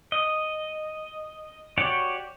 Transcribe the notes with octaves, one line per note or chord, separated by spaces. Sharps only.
D#5
F#4 G4 C#5 D5